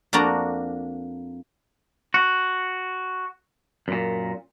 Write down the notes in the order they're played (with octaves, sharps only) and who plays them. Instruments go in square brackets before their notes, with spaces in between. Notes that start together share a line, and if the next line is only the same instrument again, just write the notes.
[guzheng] F2 A#3 D4 F#4 D5 A#5
[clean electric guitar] F#4
F#2 A#2